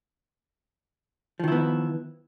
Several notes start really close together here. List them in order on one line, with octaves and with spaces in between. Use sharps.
F3 D#3 E4 B3